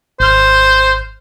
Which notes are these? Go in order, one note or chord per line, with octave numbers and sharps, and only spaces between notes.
G#1 C5 F6